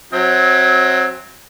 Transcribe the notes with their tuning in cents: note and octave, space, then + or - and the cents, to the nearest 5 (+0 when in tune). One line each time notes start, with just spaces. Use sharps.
F#3 +0 C4 +15 E5 -40